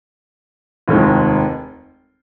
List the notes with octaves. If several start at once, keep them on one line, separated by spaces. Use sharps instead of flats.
F1 D#2 D#3 G#3